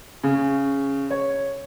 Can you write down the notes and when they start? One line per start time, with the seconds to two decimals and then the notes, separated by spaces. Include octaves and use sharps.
0.24 C#3
1.11 C#5